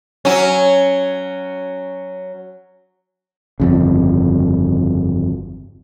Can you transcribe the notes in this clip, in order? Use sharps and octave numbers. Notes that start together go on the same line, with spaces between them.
F#3 C#4
G1 F2 C#3